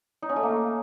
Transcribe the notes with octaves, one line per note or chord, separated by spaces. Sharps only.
D#4
C#4
A3
A#3